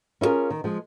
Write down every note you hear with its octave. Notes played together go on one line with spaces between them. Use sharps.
C#4 E4 F4 G#4 A#4
D#3
F3 G#3